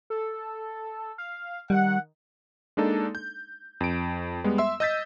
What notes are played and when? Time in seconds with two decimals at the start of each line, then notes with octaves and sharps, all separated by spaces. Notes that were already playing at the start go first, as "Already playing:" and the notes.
0.10 A4
1.18 F5
1.70 D#3 G3 F#5
2.77 G#3 A#3 D4 D#4 A4
3.15 G6
3.80 F2 D7
4.44 G3 G#3 B3
4.58 E5 C6 E6
4.80 D#5 E6 G6 A6 B6